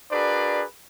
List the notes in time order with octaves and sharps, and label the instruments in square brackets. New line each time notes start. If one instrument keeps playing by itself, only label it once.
[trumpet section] D4 F#4 G#4 A#4 B4 D5